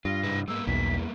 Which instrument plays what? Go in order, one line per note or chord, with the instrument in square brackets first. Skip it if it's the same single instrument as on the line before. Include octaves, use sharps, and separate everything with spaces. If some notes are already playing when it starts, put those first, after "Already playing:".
[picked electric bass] G2 [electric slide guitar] F4 [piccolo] A#6
[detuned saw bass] G#2 [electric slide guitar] C3 E4 B4
[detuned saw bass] G#2 [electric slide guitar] G3 A#3 B3 [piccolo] E6
[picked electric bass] B1 [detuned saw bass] E2 [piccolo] B6